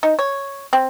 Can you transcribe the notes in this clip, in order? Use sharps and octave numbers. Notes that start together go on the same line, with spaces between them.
D#4
C#5
C4